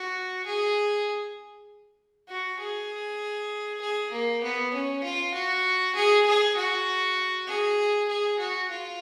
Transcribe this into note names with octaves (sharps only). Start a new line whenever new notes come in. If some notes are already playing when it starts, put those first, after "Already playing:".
Already playing: F#4
G#4
F#4
G#4
G#4
A#3
B3
C#4
F4
F#4
G#4
G#4
F#4
G#4
G#4
F#4
F4